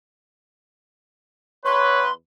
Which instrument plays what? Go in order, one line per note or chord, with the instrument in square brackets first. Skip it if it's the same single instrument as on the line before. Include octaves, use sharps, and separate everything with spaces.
[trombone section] E2 B4 [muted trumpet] C#5 [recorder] C6